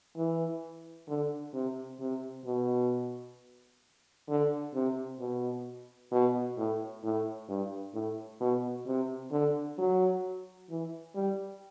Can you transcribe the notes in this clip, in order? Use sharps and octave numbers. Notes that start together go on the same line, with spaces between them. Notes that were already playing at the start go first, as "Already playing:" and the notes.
E3
D3
C3
C3
B2
D3
C3
B2
B2
A2
A2
G2
A2
B2
C3
D3
F#3
E3
G3